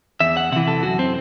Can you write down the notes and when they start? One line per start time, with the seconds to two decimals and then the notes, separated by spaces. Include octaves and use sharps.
0.20 E2 E5
0.37 F#5
0.52 C3 E3 F#5
0.68 A4
0.83 F#2 F#4
0.99 C4